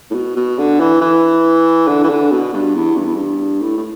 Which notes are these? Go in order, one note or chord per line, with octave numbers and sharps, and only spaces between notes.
A2
B2
B2
D3
E3
E3
D3
E3
D3
B2
G2
E2
G2
E2
G2
A2
A2